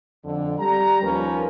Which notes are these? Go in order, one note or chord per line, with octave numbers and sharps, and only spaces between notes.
F2 D3
G3 A#5
D#2 F3 C#4 A#4 B4